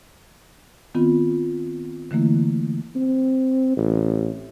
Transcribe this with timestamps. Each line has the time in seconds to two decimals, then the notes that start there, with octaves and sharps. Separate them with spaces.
0.95 D#3 B3 C4 F4
2.11 D3 E3 A3 A#3 E4
2.96 C4
3.77 A1